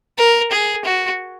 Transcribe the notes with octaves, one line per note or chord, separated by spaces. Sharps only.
A#4
G#4
F#4